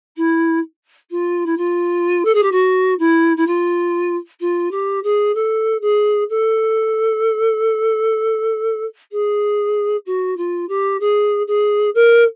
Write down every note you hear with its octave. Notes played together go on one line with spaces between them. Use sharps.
E4
F4
E4
F4
A4
G#4
G4
F#4
E4
E4
F4
F4
G4
G#4
A4
G#4
A4
G#4
F#4
F4
G4
G#4
G#4
A#4